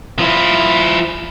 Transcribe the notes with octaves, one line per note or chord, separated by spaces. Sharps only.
F3 E4